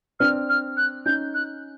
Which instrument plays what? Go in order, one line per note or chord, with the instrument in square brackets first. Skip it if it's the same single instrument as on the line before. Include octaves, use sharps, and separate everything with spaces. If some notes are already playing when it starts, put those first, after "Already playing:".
[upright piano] C4 D4 [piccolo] F6
[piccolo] F6
F#6
[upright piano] C#4 D#4 [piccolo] G6
[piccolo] F#6